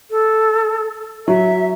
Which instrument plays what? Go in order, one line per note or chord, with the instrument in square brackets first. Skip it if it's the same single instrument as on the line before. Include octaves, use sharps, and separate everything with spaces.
[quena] A4
[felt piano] F#3 [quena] E5